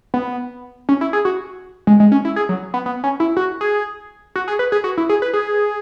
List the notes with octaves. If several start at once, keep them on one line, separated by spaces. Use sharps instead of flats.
B3
C#4
E4
G#4
F#4
G#3
G#3
C#4
E4
G#4
F#3
B3
B3
C#4
E4
F#4
G#4
F#4
G#4
B4
G#4
F#4
E4
G#4
B4
G#4